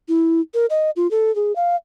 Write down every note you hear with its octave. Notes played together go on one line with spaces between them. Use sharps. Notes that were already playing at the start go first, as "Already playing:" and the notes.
E4
A#4
D#5
F4
A4
G#4
F5